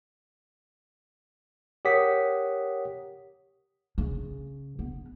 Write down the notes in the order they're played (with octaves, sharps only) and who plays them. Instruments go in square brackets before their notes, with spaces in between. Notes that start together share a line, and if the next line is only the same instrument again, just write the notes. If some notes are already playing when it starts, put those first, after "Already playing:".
[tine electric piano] G4 A#4 C#5 F#5 D#6 B6
[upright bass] C#3
B3